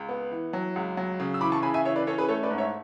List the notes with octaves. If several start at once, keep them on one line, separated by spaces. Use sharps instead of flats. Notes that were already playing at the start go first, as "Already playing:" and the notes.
Already playing: C#2
B3
E3
F#3
C#2
F#3
C#3
E6
E3 B5 D6
A5 C#6
C#3 G#5 B5
E5 G#5
E3 C#5 E5
B4 D5
C#4 A4 C#5
G#4 B4
A3 A4 C#5
B4 D5
G#2
C#5 E5